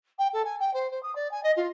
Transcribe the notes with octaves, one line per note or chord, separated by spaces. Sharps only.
G5
A4
G#5
G5
C5
C5
D#6
D5
G#5
D#5
F4